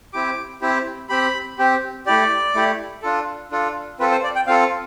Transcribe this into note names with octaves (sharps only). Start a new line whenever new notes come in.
C4 E4 G4 D6
C4 E4 G4
C4 G4 B5
C4 G4
A3 E4 G4 D5
A3 E4 G4
D4 F4 A4
D4 F4 A4
C4 F4 A4 B4
C5
D5
G5
C4 F4 A4 F5